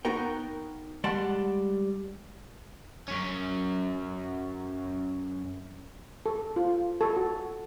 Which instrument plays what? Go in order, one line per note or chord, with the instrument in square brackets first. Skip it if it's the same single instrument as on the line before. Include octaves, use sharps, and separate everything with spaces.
[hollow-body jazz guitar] B3 D#4 F#4 A#4 G5
G3 G#3 D5 F#5 A5 C6
[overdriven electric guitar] F#2 C#4
[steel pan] A4
F4
A4
F#4